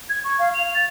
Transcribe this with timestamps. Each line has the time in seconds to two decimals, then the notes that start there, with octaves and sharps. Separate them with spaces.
0.09 G#6
0.24 C#6
0.38 F5
0.53 F7
0.74 A6